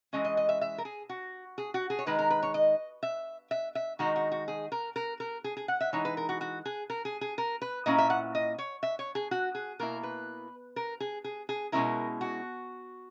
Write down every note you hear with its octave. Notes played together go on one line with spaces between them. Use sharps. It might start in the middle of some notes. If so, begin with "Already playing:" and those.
E3 G#3 C#4 D#5
D#5
D#5
E5
E5
A#4
G#4
F#4
G#4
F#4
G#4
C#5
D#3 G#3 D#4 B4
A#4
B4
C#5
D#5
E5
E5
E5
D#3 G#3 D#4 F#4
F#4
F#4
G#4
A#4
A#4
A#4
G#4
G#4
F#5
E5
E3 G#3 D#4 C#5
B4
A#4
F#4
F#4
G#4
A#4
G#4
G#4
A#4
B4
A#2 A#3 C#4 E4 D#5
E5
F#5
D#5
C#5
E5
C#5
G#4
F#4
G#4
B2 A#3 E4 A#4
B4
A#4
G#4
G#4
G#4
B2 G#3 C#4 E4 A#4
F#4